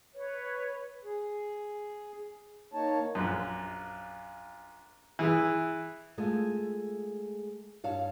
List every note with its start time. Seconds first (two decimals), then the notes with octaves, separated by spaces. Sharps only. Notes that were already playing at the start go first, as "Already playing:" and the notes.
0.14 B4 C#5
1.05 G#4
2.74 A#3 D#4 C#5 A5
3.15 A#1 F#2
5.19 E3 G#4 E6
6.18 G#3 A3 F4 G#4 A4
7.84 G2 C#5 F5 A5